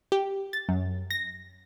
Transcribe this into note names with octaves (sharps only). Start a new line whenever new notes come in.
G4
A6
F#2
A#6